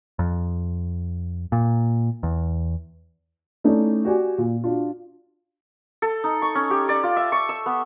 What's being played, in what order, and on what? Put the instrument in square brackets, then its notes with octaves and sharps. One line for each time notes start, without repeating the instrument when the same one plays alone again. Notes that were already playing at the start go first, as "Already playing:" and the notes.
[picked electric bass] F2
A#2
E2
[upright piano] A3 C#4 D#4 E4 C#5 D5
F#4 G4 D5 G#5
A#2
D4 F4 F#4
[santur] A4
D#4
C#6
C#4
G4
D5
F4
E5
C#6
E6
B3